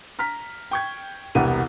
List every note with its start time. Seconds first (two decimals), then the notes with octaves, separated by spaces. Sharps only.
0.19 A#5 F6 B6
0.71 G5 C#6 G#6
1.35 E1 C2 B3 G4 D#7